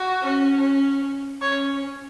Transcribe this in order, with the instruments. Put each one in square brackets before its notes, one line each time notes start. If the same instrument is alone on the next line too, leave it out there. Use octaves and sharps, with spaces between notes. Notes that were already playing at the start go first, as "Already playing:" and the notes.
Already playing: [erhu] F#4
[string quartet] C#4
C#4
[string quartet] C#4 [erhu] C#5